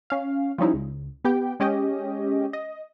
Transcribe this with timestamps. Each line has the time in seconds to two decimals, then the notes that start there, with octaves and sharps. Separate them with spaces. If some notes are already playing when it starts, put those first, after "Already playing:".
0.10 C#4 F5
0.58 F3 G3 C#4 D#4 E4
0.74 C#2
1.25 B3 G4 G5
1.60 G#3 C#4 G4 D#5
2.53 D#5